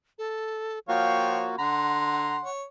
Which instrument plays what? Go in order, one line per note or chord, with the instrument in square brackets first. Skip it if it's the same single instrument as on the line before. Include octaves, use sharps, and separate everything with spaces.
[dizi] A4
[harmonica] F3 C#5 F5 [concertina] A#3 F4 F#4 [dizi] G5
[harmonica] D3 C6 [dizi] F#5 [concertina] A#5
[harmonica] C#5